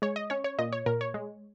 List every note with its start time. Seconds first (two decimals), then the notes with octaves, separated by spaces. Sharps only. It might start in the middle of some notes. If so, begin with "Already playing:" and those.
0.02 G#3 C#5
0.16 D#5
0.30 C#4 C#5
0.44 C#5
0.59 A#2 D#5
0.73 C#5
0.86 A#2 A#4
1.01 C#5
1.14 G#3